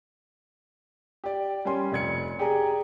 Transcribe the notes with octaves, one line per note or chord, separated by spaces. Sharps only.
G4 D5
G3 C#4 G#5 C6
F1 D5 G#6 C#7
G4 G#4 D5 G#5 A#5